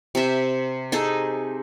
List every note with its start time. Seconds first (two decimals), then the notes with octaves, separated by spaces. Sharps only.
0.15 C3 E5
0.92 D#4 G#4 A4